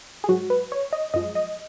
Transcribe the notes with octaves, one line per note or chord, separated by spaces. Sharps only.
G#4
G#2 F#3 F#4
B4
C#5
D#5
F#2 F3 G#3 D#5
D#5